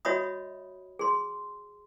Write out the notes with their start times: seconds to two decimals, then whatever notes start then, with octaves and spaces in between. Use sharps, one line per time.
0.05 F#4 C#5 D#5 E5 B5 D#6
0.99 G#4 C6